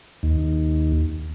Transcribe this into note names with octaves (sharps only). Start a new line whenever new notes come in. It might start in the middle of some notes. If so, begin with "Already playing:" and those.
D#2